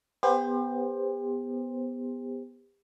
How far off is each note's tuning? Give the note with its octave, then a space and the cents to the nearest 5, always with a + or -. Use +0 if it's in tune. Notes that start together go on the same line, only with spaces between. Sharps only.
B3 +5 G4 +40 C5 +5